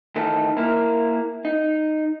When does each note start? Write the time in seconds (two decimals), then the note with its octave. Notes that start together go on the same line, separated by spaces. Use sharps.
0.16 D#3 E3 A3 D#4 A4
0.57 A#3 E4 A#4
1.45 D#4